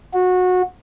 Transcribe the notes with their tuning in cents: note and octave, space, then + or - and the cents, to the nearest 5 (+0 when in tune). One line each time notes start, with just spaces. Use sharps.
F#4 -20